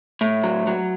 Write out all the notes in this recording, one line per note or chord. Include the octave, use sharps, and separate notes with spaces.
A2
F#3
F#3